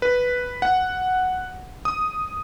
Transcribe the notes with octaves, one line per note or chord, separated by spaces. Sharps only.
B4
F#5
D#6